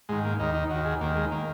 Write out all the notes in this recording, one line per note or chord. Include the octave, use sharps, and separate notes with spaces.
G#2 D#3 G#3
A#3
D#2 D#3 D#4
D#4
D#2 D#3 F#4
G#4
D#2 D#3 A#3
G#3
D#3 A#3